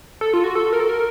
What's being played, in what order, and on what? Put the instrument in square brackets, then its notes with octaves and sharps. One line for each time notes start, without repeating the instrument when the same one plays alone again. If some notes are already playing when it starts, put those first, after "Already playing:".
[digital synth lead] A4
F4
F#4
A4
A#4
A4
A#4